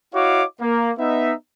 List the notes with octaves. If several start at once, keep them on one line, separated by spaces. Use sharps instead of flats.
E4 F#4 C#5 D#5 F5 D6
A#3
B3 D#4 E5